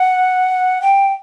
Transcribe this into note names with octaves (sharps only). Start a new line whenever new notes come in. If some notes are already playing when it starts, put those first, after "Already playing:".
Already playing: F#5
G5